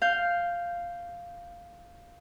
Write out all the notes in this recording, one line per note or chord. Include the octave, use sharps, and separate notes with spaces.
F5 G6